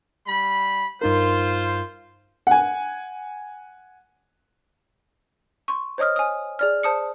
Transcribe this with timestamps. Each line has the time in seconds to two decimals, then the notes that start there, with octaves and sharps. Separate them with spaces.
0.27 G3 B5
1.02 G2 D#4 F4 A#4 C5
2.47 F#5 G#5
5.68 C6 C#6
5.98 C5 C#5 D#5 D#6 F6
6.16 G#5 D#6
6.59 G#4 D5 F6
6.83 C5 A5 D#6 C#7